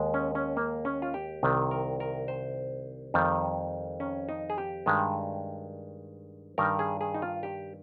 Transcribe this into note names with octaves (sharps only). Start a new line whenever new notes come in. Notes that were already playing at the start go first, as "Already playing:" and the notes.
Already playing: D#2 G#3
C#4
C#4
A#3
C#4
F4
G4
C2 C3 D#3
A#4
A#4
C5
F2 D#3 G3
C#4
D#4
G#4
G4
G2 D#3 G#3
G2 D#3 G3 A#4
G#4
G#4
D#4
F4
G4